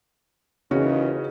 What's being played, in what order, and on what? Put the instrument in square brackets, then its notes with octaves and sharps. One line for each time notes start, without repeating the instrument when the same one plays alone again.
[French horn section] D#2 E3 D#4 [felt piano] C#3 C#4 F#4